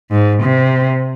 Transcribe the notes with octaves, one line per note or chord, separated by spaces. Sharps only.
G#2
C3